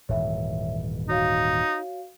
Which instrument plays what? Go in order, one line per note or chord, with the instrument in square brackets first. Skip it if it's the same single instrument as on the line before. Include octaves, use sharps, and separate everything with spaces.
[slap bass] D#1 G#2 E3 [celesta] C#5 E5
[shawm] D#4 [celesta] F#4 C#5 F5